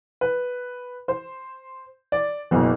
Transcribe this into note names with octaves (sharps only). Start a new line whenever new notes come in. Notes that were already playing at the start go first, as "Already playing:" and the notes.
B4
C5
D5
F#1 B1